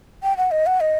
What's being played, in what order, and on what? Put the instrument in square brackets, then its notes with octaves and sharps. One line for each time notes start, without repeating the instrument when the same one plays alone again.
[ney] G5
F#5
D#5
F#5
D#5